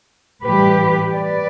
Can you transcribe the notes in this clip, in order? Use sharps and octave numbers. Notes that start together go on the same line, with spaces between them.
A2 E3 G3 G4 B4
B4 D5